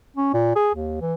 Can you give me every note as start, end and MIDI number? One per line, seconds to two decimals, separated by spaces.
0.16 0.29 61
0.34 0.52 46
0.56 0.72 68
0.74 1.01 39
1.01 1.15 52